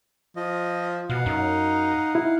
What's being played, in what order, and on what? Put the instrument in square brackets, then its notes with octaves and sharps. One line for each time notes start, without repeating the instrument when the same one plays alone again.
[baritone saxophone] F3 [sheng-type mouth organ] D#5
[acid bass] B2 [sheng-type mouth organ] F5 F#5
[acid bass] F#2 [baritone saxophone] D#4
[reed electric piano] E4